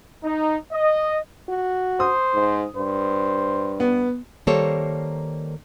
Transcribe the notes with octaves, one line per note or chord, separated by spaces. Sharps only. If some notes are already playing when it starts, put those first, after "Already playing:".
D#4
D#5
F#4
C5 D#6
G#2
G2 C5
B3
D#3 G3 A#3 A4 C5 C#5